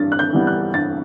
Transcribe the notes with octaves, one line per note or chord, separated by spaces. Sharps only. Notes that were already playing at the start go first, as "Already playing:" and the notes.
Already playing: G2 E3 A6
F#6
G6
E3 G3 B3
F#6
G2 A6